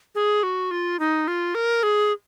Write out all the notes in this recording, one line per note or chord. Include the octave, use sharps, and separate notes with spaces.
G#4
F#4
F4
D#4
F4
A#4
G#4